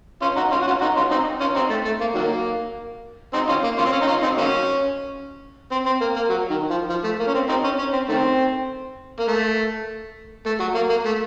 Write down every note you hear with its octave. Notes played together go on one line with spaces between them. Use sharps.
C#4 F4
D#4 F#4
C#4 F4
F#4
C#4 F4
D#4 F#4
C#4 F4
C4 D#4
C#4 F4
C4 D#4
A3
A3
A#3
D#3 F#3 A#3
C4 D#4
C#4 F4
A#3
C#4 F4
C4
C#4
D#4
C#4 F4
C4 D#4
F#3 A#3 C#4
C4
C4
A#3
A#3
F#3
D#3
F3
F3
A3
A#3
C#4
C4
C4 D#4
C#4
C#4
C4
D#3 A3 C4
A#3
A3
A3
F#3
A#3
A#3
A3